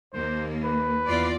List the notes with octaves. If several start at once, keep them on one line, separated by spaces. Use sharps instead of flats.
D#2 A#3 C5
B4
E2 F4 D5